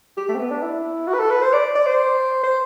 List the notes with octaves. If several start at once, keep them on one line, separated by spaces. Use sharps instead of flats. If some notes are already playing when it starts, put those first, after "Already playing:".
G4
A3
C4
B3
D4
E4
F#4
B4
A4
B4
C5
D5
D5
C5
C5